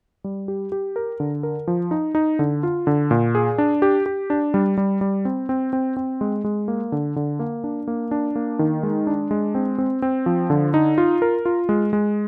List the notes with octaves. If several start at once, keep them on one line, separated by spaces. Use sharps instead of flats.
G3
G4
G4
A#4
D3
A#4
F3
D#4
D#4
D3
F4
D3
A#2
G#4
D4
G4
G4
D4
G3
G3
G3
C4
C4
C4
C4
G#3
G#3
A#3
D3
D3
A#3
D4
A#3
D4
A#3
D#3
G#3
D4
G#3
C4
C4
C4
F3
D3
D#4
F4
A#4
F4
G#3
G#3